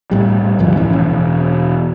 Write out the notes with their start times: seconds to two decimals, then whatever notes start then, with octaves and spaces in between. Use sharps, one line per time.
0.11 A2 G3
0.59 D2 G2 F3 G3
0.76 A2 E3 C#4
0.93 E1